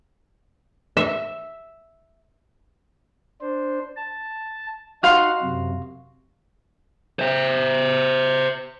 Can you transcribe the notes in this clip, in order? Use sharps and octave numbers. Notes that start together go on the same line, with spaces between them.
E5
D4 C5
A5
D#4 F#4 F5 F#5 C6
F#2 C3
C5 E5